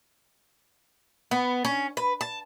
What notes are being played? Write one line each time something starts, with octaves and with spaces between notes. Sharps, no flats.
B3
C#4
B4
A5